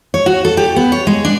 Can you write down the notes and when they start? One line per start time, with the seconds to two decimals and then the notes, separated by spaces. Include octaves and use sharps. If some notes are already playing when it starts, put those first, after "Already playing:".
0.14 C#5
0.26 F#4
0.45 A4
0.57 G4
0.76 B3
0.92 C#5
1.07 G#3
1.25 D4